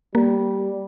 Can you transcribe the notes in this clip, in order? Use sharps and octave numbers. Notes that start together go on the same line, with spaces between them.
G3 A#3